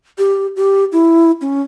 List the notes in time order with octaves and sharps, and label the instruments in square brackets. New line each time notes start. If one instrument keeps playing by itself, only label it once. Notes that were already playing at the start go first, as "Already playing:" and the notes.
[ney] G4
G4
E4
C#4